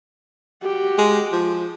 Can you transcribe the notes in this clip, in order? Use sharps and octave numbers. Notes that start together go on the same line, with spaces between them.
F#4 G4
G#3
F3